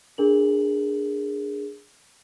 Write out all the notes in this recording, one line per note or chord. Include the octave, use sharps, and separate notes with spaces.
D4 G#4 A#4 F#7